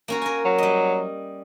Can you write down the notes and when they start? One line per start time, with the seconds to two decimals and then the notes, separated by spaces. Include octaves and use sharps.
0.08 A#3 C#4 F#4
0.22 A#4 G#5
0.45 F#3
0.58 G3 D#5